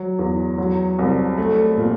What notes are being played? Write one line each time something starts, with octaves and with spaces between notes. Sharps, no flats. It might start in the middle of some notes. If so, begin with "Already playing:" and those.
Already playing: F#3
E2
F#3
C2
A3
A#2